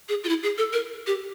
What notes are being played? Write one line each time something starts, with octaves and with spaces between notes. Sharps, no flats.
G#4
F4
E4
G#4
A4
A#4
G4